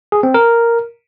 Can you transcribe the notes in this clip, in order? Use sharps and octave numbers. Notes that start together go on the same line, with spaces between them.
G#4
C4
A#4